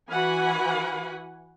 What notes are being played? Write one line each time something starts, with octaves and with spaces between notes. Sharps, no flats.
E3 F#4 F#5 G#5 B5